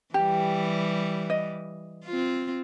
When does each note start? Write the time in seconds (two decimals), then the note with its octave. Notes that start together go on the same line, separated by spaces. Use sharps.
0.14 E3 G3 G4
1.30 D#5
2.05 C4 F4